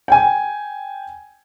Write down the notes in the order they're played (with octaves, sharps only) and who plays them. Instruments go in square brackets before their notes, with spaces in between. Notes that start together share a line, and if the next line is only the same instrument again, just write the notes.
[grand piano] G5 G#5